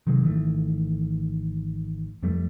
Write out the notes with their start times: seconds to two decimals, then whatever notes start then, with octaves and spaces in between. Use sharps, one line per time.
0.07 C3 D#3 F#3 G#3
0.22 G#1 D#3 E3 A3
2.23 F2 F3 G3 A3